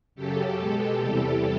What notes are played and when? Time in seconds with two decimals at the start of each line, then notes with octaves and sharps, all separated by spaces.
0.15 F#2 C#3 F#3 G4 A4
0.56 B2 G#3 G4 A4
0.97 E2 C3 E3 G3